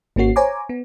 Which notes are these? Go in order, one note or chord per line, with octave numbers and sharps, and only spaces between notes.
G#1 A#3 C#4 F#4 C7
C5 C#5 G#5 A#5 D6
B3